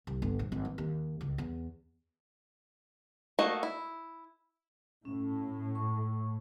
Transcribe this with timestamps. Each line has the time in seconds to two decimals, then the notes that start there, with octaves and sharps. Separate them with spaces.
0.07 C2
0.22 G1
0.39 A#1
0.52 G#1
0.65 E3
0.78 D#2
1.21 C#2
1.38 E2
3.39 A3 A#3 F#4 D#5
3.63 E4
5.05 A2 C#4
5.75 C#6